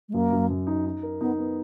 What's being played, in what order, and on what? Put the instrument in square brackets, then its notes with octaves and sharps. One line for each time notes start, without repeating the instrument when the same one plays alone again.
[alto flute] G#3
[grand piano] F#2 [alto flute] A#3
[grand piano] F#2
F#2
D#4
D#4
A#4
[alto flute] B3 [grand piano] D#4
[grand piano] B3